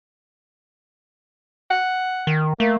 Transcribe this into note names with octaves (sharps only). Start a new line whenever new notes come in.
F#5
D#3
A3 A#3